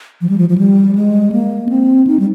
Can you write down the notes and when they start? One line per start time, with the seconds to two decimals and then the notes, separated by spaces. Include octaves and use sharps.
0.21 F3
0.29 G3
0.38 F3
0.49 F3
0.58 G3
0.95 G#3
1.32 A#3
1.69 C4
2.07 D#4
2.19 G3